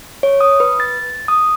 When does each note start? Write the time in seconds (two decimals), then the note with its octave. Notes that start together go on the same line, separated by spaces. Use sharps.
0.23 C#5
0.41 D#6
0.60 B4
0.80 A6
1.28 D#6